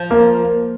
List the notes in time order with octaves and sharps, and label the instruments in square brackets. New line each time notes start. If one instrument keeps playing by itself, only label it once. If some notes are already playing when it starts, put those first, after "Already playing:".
Already playing: [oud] F3
[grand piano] A#3